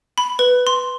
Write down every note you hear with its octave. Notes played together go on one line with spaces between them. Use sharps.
B5
B4
C6